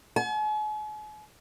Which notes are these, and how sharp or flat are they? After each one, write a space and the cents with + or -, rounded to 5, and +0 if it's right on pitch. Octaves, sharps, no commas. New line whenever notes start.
G#5 +45